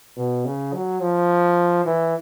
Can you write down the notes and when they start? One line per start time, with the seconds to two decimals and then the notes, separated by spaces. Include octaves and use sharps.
0.17 B2
0.45 C#3
0.74 F#3
1.01 F3
1.85 E3